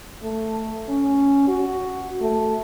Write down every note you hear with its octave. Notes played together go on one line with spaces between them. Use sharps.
A3
C#4
F#4
A3